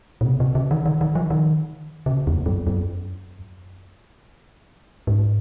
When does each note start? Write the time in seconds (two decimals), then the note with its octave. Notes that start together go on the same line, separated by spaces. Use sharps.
0.21 A#2
0.25 C3
0.40 C3
0.55 C#3
0.71 D#3
0.86 D#3
1.01 D#3
1.15 F3
1.30 D#3
2.06 C#3
2.27 F2
2.46 F#2
2.67 F#2
5.07 G#2